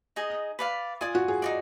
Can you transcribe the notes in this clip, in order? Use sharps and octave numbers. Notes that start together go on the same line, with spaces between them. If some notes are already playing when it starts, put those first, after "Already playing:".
D#4 G#4 D#5
B4 D5 F5 B5
F4 D5 G#5 D#6
F#4
G#4
D#4 F#4 D5